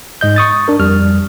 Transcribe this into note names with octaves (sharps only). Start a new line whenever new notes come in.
G#2 D#5 G6
C#6 D#6 A6
D4 A#4
F2 G3 F6